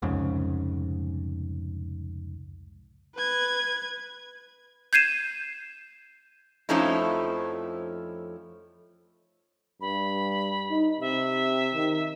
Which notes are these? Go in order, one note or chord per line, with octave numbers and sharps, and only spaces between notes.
C2 F2 G#2 C#3
B4 G#6
G6 G#6 C7 D#7 E7
F2 F3 A3 C#4 D#4 E4
G2 B5
D#4
C3 E5
D#3